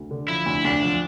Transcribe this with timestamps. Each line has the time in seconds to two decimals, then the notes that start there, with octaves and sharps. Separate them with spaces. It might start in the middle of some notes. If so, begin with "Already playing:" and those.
Already playing: D2
0.11 D3
0.28 F3 E4
0.46 D2
0.64 D2 D4
0.82 F3